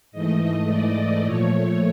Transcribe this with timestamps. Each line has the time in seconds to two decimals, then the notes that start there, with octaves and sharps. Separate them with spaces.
0.12 G#2 E3 A3 D#5
0.68 D5
1.24 A#2 F3 A3 C#5